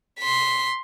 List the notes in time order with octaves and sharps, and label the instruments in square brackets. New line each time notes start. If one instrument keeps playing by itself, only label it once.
[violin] C6 B6